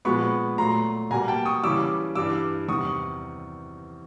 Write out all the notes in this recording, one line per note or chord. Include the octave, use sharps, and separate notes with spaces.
A#2 F3 G#3 B3 B5 C#6
A#2 F#3 A3 A#5 C6
B2 G3 A#3 G#5 A#5
G5 A5
C#6 D#6
C#3 E3 G3 D6 E6
G2 E3 G3 D6 E6
E2 C3 D#3 G3 C#6 D#6